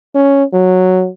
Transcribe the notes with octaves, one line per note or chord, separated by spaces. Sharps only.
C#4
F#3